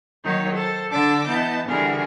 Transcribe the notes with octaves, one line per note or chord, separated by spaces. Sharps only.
D#3 F#3 A#3 D#4 C#5
A4 C5 A6
D3 D4 D5 A5 D6 E6
E3 B3 D#5 A5 G6
D3 E3 G3 F#4 G#4 A#4